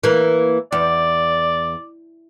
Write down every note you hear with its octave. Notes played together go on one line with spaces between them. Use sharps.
E3 A#3
E2 D5